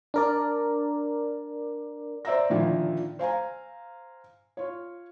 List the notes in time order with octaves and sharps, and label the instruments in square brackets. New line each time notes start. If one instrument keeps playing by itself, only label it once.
[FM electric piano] D4 A#4 D5
[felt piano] C5 D5 E5 A#5 E6 A#6
A#2 D3 D#3 F3 E4
C5 F5 G#5 A#5
F4 C#5